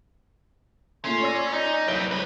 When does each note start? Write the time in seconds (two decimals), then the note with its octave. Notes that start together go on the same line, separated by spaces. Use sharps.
1.05 A#2 A3 C#4 C6
1.23 C#5 D5 E6 A#6
1.53 D#4 D5
1.88 C2 F#3 C4 B4 D7 G7
2.11 C#2 B4